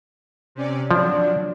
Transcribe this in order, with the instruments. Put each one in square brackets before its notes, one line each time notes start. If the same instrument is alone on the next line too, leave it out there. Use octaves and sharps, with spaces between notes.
[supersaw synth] C3 C#4 D5
[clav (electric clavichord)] F3 [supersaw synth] F#3 D4 [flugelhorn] D5